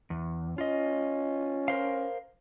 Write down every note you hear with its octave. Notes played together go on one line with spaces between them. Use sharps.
E2
C#4 F4 D#5
A#4 C5 F5